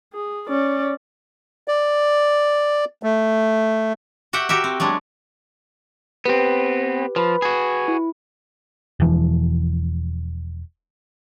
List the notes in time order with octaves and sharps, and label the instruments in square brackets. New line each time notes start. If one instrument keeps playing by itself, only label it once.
[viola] G#4
C#4 D5
[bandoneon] D5
A3
[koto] F#4 G4 E5 F#5 G5
F#4 G4 A#4 E5
C4
F#3 G#3 B3 D4
[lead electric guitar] B3 C4 [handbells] G4 B4
[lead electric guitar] F3 [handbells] B4 B5
[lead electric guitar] F#4 G#4
[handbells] E4
[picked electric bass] E1 E3 F3